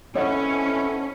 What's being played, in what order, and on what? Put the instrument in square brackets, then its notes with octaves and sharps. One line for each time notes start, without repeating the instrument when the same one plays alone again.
[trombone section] B1 C4 A4 [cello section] C#4 [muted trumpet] E4 [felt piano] C#5 D#5 F#5